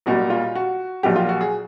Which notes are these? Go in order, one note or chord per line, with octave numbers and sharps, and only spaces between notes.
B1 A#2 G3 F#4
F4
F#4
A#1 A#2 F#3 G4
F4
F#4
G#4